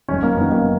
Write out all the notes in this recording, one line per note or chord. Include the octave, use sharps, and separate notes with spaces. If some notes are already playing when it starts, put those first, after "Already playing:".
F#1 F#2 D#3 C#4
A#3
F#1 F#2 D#3 B3
A#3